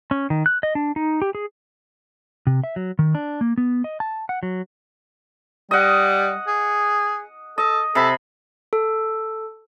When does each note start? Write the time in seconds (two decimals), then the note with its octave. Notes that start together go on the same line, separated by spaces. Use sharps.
0.11 C#4
0.30 D#3
0.46 F#6
0.63 D#5
0.75 D4
0.96 D#4
1.22 G4
1.35 G#4
2.47 C3
2.64 E5
2.76 F#3
2.99 D#3
3.15 D4
3.41 A#3
3.58 B3
3.84 D#5
4.00 A5
4.29 F#5
4.43 F#3
5.71 G3 D#5 F#5
6.47 G#4
7.58 A4 D#5
7.95 C3 A4 B5
8.73 A4